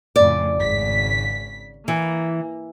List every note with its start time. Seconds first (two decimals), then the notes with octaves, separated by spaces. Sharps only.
0.16 F2 A2 C#3 D5
0.56 G#1 C#3 B6
1.88 E3 A#3